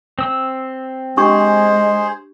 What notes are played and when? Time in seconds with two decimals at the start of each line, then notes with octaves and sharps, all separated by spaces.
0.19 C4 E6
1.17 G#3 D4 G4 G#4 C5 C#6